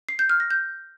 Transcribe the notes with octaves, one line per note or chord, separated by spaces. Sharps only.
C7
G6
F6
A#6
G6